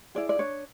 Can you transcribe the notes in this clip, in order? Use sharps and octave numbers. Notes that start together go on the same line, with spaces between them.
E4 G#4 D5
D5
D4 C#5